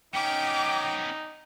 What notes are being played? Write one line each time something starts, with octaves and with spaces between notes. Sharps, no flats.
B3 C#4 D#4 G5 D6